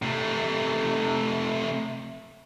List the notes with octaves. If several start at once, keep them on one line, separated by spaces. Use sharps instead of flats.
C3 A3